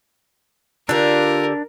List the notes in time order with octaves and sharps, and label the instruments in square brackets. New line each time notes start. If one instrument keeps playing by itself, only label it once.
[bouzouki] D3 G4 [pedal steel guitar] D4 [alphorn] F4 [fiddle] A#4